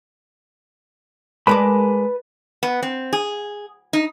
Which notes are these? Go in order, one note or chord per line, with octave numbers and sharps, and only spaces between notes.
G#3 A#4 B4 D5 A5 B5
B3
C4
G#4
D#4